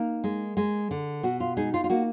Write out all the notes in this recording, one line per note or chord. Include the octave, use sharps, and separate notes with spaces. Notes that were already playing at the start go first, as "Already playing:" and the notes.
Already playing: A#3 D#4 A#4
G#3
G#3
D3
B2 F#4
F4
G#3 D#4 G#4
F4
F4
A#3 F#4